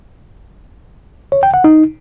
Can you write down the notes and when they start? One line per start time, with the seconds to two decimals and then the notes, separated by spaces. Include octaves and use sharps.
1.32 C#5
1.43 G5
1.54 F#5
1.64 D#4